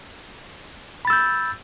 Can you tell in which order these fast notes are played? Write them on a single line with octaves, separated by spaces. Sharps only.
B5 A6 E6 G6